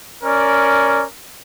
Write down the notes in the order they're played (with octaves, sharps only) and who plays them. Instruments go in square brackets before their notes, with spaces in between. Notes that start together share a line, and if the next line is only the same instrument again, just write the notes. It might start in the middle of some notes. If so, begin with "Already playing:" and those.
[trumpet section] C#4 A#4 D5